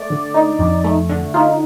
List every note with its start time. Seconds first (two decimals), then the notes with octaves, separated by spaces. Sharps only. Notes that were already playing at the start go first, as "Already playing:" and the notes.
Already playing: A3 D5
0.10 D3
0.34 D#4
0.59 F2
0.84 A3
1.09 D3
1.34 D#4 F4